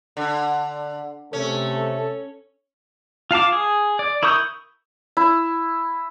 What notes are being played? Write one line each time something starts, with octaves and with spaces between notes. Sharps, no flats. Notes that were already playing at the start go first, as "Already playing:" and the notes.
D3
C3 A3 C#4 A4
F4 F5 A5 D6
G#4
D5
E4 A#4 C#6 D#6 G6
E4